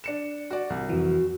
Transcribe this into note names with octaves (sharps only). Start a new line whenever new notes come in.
D4 C#7 E7
F#4 D5
C2
F2 E3 F#4